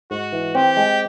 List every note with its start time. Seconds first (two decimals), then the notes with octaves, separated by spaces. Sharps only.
0.11 G#2 F#4
0.32 E3
0.55 C4 G4
0.77 G#3